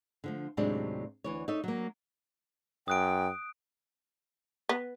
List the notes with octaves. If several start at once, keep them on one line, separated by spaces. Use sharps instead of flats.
D3 F3 A3
D#2 A2 C3 F#3 G#3 D4
D2 E3 C#5
D#4 A4 C#5 E5
F#3 A#3
F#2 G5 D#6 F#6 D7
B3